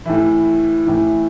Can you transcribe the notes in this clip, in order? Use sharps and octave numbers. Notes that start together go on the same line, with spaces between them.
A2 E3 E4
A2 E3